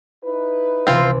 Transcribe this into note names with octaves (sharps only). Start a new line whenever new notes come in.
D#4 E4 B4
C#2 C3 E3 C4 F4